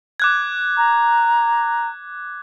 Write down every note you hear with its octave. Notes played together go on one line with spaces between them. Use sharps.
D6 F#6 G#6
A#5